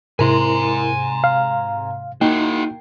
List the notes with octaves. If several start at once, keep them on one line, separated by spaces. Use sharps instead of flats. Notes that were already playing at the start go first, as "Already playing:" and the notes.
G#2 C3 E4 A#4 G#5 A#5 C6
F5
A#3 D#4 E4 F#4 G5 C7